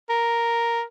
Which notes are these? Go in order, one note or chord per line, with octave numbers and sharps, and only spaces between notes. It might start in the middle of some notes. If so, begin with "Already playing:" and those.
A#4